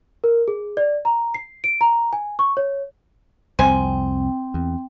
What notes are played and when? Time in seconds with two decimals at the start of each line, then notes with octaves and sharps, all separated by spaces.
0.24 A#4
0.48 G#4
0.77 D5
1.05 A#5
1.34 C7
1.64 D7
1.81 A#5
2.13 G#5
2.39 C#6
2.57 C#5
3.59 C2 F2 C4 C5 G5 G#5
4.54 E2